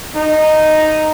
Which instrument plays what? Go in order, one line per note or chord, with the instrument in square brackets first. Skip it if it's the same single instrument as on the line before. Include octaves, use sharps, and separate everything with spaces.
[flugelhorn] D#4